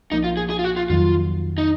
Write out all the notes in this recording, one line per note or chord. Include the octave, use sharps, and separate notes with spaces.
B1 A#2 F3 A#3 D#4
F4
G#4
G#4
F4
F#4
F4
F2 D#3 F#3 F4
D#4